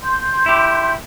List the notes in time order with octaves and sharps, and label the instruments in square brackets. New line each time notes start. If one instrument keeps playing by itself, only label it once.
[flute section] C6 G6
[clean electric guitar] E4 G4